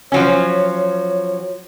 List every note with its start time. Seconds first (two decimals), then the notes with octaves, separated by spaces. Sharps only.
0.12 F3 F#3 C#4 C#5